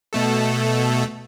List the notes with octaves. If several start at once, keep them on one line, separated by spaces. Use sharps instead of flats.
B2 A3 A4